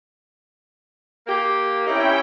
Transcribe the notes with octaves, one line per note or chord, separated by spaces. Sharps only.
A#3 G4
C4 C#4 D#4 E4 G4 G5